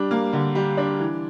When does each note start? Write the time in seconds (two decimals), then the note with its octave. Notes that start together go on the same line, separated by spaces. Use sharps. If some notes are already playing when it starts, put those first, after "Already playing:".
Already playing: G3 D4
0.11 A#3
0.33 D3
0.55 G3
0.77 D4
1.00 E3